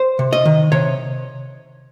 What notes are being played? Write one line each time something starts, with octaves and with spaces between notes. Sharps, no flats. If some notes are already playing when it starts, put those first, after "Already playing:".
Already playing: C5
C3
D#5
D#3
C3 C#5